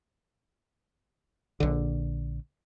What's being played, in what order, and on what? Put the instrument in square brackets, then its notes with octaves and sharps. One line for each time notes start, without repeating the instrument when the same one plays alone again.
[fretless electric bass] A#1 D3